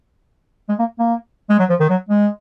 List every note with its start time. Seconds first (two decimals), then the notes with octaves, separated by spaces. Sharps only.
0.69 G#3
0.79 A#3
0.99 A#3
1.49 G#3
1.59 F#3
1.69 F3
1.80 D#3
1.90 F#3
2.09 G#3